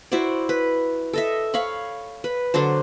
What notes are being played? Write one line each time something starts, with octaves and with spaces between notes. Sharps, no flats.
E4 F#4 C5 D5
B4
A4 D#5 E5
C#5 F5 B5 C#6
B4
D3 F#3 D4 C5